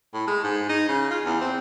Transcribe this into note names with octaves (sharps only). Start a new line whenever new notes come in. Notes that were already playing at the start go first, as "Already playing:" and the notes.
A2
G#3
G#2
D#4
C#3
F4
E2
C4